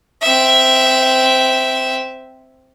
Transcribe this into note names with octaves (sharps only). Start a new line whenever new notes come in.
C4 E5